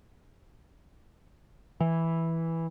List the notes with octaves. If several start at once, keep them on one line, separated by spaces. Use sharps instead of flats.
E3